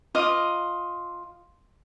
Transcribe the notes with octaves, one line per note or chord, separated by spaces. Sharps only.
F4 D#5 D6